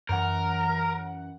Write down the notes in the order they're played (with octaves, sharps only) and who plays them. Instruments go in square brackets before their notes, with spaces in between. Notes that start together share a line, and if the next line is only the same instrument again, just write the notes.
[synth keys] F#2 E3 F#5 [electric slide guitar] A#4